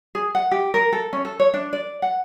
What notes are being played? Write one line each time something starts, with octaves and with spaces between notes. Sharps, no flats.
G#4
F#5
G4
A#4
A4
C#4
A4
C#5
D4
D5
F#5